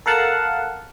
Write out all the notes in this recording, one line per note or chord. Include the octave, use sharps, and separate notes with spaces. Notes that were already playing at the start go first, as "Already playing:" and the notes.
A4 A#4 F5 F#5 A5